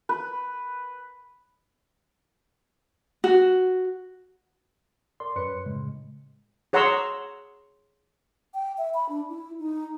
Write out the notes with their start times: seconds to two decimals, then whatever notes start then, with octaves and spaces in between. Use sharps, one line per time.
0.09 B4
3.24 F#4
5.20 A#4 D5 C6
5.36 F#2 B4 C#5 C6 C#7
5.65 A2 C#3 G#3
6.73 G#4 C#5 F#5 A#5 C6 E6
8.54 G5
8.78 E5
8.94 B5
9.09 D4
9.29 E4
9.60 D#4